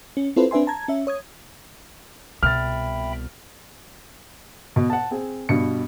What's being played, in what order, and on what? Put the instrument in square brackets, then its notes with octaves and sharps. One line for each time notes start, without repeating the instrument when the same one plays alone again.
[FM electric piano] C#4
C4 E4 F4 A4 B4 C5
C4 D4 B4 E5 G#5 C6
A5 A#5 G#6
C#4 E5
C#5 D#6 G#6
[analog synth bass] C2 [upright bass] B2 [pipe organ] E5 G5 B5 [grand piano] F6 A6
[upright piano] B2
F#5 A5
C4 G#4
G2 B2 C#7